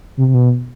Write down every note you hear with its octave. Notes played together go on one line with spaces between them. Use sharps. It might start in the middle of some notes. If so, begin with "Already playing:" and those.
C3
C3
B2